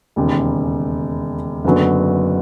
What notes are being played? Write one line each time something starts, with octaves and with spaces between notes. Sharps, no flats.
E1 D#2 C#3
F#1 F#2 D3 F#3 B3